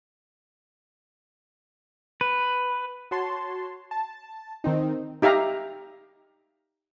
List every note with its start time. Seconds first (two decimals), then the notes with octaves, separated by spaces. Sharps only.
2.21 B4
3.11 F#4 C#5 A5 C6
3.91 A5
4.64 D#3 C4 D#4
5.22 D#4 G4 E5 F5 A#5